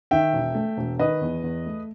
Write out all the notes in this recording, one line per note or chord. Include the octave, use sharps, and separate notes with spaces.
D#3 E5 G5
E1
A3
E1
D#3 B4 D#5
E2
E2
A3